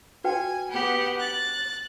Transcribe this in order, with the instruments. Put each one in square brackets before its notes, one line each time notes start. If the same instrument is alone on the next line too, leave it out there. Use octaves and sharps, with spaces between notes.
[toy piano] F#4 B4 G5 [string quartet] G#5
[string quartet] B3 G4 F#5
F#6 A6